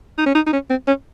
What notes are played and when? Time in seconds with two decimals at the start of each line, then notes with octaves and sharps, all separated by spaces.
0.18 D#4
0.26 C#4
0.35 D#4
0.46 D#4
0.53 C#4
0.70 C4
0.87 C#4